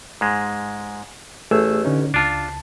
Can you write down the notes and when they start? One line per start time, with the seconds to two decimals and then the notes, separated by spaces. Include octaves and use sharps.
0.21 G#2 G#3
1.51 A1 A3 G#4 E6
1.85 D3 C#4 D#4
2.14 C#2 D4 F4 A5